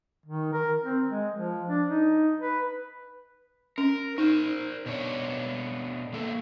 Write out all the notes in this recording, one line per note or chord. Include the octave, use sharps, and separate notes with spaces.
D#3
A#4
C4
G#3
F3
D4
D#4
B4
C#4 A#4
D#4 A#4 C5
B2 D4 C#5
A2 A#3 A4